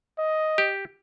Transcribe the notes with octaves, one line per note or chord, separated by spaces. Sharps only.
D#5
G4